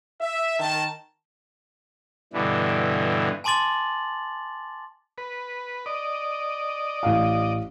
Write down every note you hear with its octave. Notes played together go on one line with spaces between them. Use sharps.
E5
D#3 A5
G2 B2 D3 E3
G#5 A5 C6 D6 A6 F#7
B4
D5 D#5
A1 F5